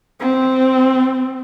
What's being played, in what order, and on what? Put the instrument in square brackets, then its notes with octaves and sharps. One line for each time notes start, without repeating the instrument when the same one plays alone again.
[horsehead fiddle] C4